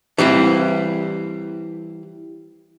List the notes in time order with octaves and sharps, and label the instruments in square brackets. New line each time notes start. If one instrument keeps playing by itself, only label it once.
[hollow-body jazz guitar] E3 G3 C4 E4